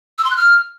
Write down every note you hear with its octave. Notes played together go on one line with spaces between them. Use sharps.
E6
C6
F#6
F6